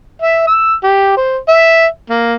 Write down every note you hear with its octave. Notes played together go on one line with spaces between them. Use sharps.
E5
E6
G4
C5
E5
A#3